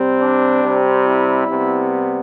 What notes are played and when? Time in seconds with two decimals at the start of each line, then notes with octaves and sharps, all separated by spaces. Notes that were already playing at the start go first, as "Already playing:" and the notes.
Already playing: C3 G3 C4
0.20 D4
0.63 C3 G3 C4
1.06 E4
1.49 C3 G3 B3